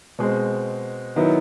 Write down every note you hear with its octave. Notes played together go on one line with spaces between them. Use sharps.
B2 G#3 C4
D#3 F#3 B3 E4